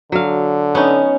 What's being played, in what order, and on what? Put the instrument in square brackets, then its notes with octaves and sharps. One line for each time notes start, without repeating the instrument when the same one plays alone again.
[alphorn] D3 [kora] F#3 F5
[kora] B3 D#4 [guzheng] C#4